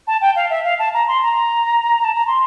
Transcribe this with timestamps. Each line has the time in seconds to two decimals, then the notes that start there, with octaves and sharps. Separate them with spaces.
0.07 A5
0.21 G5
0.36 F5
0.50 E5
0.64 F5
0.79 A5
0.94 A#5
1.08 C6
1.22 A#5
2.04 A5
2.15 A#5
2.27 C6